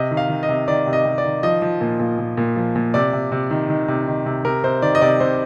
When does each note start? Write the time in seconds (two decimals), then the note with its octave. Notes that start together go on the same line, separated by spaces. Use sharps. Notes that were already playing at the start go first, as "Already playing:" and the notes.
Already playing: C3 D#5
0.11 D#3
0.17 F5
0.29 D#3
0.43 D#5
0.49 C3
0.68 D#3 D5
0.87 C3
0.93 D#5
1.05 C3
1.18 D5
1.24 D#3
1.43 F3 D#5
1.62 F3
1.81 A#2
2.00 A#2
2.19 A#2
2.37 A#2
2.56 F3
2.76 A#2
2.94 C3 D5
3.13 C3
3.32 C3
3.51 D#3
3.70 D#3
3.88 C3
4.07 D#3
4.26 C3
4.45 C3 A#4
4.64 C3 C5
4.82 D#3 D5
4.95 D#5
5.01 C3 D5
5.20 C3 C5